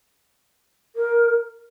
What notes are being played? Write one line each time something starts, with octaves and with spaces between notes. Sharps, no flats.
A#4